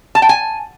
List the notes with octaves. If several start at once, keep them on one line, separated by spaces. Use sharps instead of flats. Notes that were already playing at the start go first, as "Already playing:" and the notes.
A5
G5
G#5